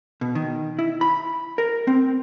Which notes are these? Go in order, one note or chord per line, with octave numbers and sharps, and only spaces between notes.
B2
D#3
E4
B5
A#4
C4